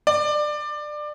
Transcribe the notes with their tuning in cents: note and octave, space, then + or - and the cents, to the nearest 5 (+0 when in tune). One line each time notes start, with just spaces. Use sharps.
D5 +20